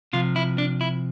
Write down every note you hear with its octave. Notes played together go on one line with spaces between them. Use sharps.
C3 F3 F4
E4
D4
E4